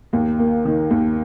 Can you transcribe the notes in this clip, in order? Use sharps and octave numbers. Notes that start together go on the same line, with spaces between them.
D#2
A#3
D#3
D#2